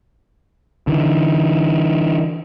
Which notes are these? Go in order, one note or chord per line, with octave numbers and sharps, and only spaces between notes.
D3 E3